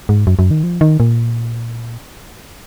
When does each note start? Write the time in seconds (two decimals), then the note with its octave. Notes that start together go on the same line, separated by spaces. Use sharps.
0.09 G#2
0.27 F#2
0.39 F#2
0.51 D#3
0.63 F3
0.81 D#3
1.00 A#2